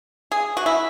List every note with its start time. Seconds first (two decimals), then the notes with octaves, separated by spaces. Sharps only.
0.32 G#4
0.57 F#4
0.66 E4